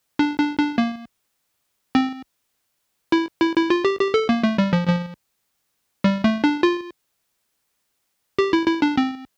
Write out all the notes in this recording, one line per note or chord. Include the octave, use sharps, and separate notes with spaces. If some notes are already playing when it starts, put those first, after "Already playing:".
D4
D4
D4
A#3
C4
E4
E4
E4
F4
G4
G4
A4
A#3
A3
G3
F3
F3
G3
A3
D4
F4
G4
E4
E4
D4
C4